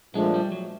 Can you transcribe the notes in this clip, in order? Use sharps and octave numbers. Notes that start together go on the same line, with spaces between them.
A#2 F3 G#3 A3 D4
G3
F#3